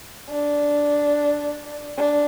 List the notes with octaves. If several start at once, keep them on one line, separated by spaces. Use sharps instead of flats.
D4
D4